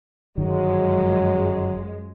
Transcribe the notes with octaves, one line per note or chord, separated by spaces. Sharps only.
G1 F#2 D#3 F3 F#3 G#3